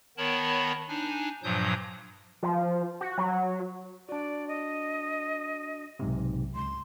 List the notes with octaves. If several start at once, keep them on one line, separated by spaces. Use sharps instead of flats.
D#3 B3 A#4 C#5 A5 B5
D4 D#4 G#5
G2 A#2 F3 F#3 D#6 G6
F3
F#4
F#3
D4 F#4 D5
D#5
B1 G#2 C3
C#2 C6